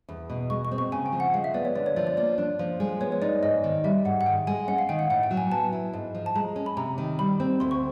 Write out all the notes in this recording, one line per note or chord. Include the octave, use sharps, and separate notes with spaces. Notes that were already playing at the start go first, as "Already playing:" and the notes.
E2
B2
G#3 C#6
C#6
C4
C#6
C#3 G#5
G5
F3
F#5
G#3 F5
E5
B3 D5
C#5
D3 D5
C#5
F3 D5
D5
A#3 D5
D4
F3
G#3
B3 C#5
C#5
D#4 D5
G#2 D#5
D#3
G3 E5
G#2 F#5
F#5
D#3 G5
G#3 G#5
C#4 F#5
F5
D#3 G5
F#5
A2 F#5
G5
F#3
G#5
B3 A5
E4
G#2
F3
A5
G#3 A#5
C#4
B5
C3 A#5
D#3
G3 B5
C4
D2 C6
C#6